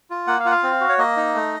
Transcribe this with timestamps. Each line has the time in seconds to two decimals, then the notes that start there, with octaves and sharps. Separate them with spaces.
0.11 F4
0.27 A#3 F#5
0.40 F5
0.45 F4 F#5
0.51 F5
0.63 C4
0.81 F#4
0.89 C#5
0.98 A#3 D#5
1.17 D#4
1.35 A3